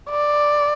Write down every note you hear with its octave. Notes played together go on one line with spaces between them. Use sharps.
D5